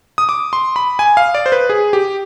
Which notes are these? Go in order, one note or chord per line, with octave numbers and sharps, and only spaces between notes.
D#6
D6
C6
B5
G#5
F5
D5
C5
B4
G#4
G4